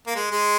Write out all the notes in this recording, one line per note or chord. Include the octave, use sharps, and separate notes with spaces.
A#3
G#3
G#3